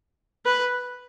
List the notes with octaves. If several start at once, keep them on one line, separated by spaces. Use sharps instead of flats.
B4